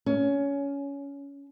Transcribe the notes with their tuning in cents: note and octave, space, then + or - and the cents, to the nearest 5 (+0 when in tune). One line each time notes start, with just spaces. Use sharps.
C#4 +20